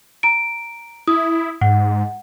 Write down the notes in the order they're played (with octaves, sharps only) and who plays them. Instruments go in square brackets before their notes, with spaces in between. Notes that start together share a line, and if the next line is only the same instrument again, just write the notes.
[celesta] A#5 D7
[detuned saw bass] E4 [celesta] D#6
[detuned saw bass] G#2 [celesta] F#5